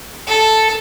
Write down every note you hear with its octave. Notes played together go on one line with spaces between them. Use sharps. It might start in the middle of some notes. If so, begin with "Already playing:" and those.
A4